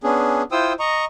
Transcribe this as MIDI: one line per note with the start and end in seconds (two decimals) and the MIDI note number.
0.04 0.43 59
0.04 0.43 61
0.04 0.43 62
0.04 0.43 68
0.52 0.73 64
0.52 0.73 65
0.52 0.73 72
0.52 0.73 79
0.52 0.73 87
0.52 0.73 88
0.79 1.05 75
0.79 1.05 82
0.79 1.05 85